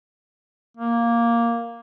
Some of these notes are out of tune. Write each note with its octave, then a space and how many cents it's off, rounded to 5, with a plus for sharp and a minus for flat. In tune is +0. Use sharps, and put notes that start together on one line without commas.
A#3 +0